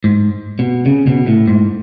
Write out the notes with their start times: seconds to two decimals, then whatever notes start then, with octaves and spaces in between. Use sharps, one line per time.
0.04 G#2
0.59 B2
0.86 C#3
1.07 B2
1.27 A2
1.47 G#2